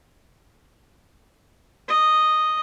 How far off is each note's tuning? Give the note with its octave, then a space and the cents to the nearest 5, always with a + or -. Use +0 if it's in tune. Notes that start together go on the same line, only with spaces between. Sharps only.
D#5 -5